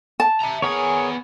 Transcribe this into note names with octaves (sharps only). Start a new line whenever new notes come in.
A5
E5 A#5
B3 G#4 A#4 C#5 G#5